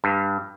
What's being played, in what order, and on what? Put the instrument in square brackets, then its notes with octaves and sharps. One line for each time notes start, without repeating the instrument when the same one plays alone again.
[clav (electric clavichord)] G2